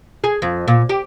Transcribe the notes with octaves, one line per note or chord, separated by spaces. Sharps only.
G#4
F2
A#2
G4